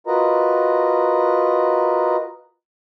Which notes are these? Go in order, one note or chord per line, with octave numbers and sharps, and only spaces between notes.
F4 F#4 A#4 B4 D#5 A#5